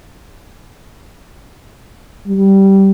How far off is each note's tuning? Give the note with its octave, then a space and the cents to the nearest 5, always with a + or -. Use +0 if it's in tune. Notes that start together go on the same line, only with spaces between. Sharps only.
G3 -10